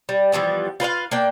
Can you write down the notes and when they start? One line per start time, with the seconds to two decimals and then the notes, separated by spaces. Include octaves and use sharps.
0.09 G3
0.32 E3 F3 G3 B3
0.80 F4 B4 C5 F5
1.11 A#3 D4 G5